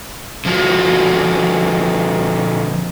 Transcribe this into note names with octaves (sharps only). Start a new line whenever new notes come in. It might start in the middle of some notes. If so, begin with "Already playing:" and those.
D3 F3 F#4 A5